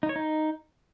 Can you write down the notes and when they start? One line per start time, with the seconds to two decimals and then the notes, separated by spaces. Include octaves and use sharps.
0.03 D#4
0.09 C#5
0.16 D#4